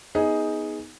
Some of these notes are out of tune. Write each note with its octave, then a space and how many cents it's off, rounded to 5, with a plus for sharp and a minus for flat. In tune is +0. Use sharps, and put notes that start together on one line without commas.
B3 -5 D#4 +15 G#4 +0